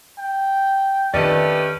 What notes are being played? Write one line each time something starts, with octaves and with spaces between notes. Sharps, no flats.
G5
F2 D#3 A3 C#4 G4 B4 D5 D#5